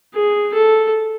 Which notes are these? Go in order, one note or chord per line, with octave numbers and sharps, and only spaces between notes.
G#4
A4